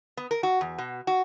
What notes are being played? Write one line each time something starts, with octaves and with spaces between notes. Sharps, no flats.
B3
A#4
F#4
E2
B2
F#4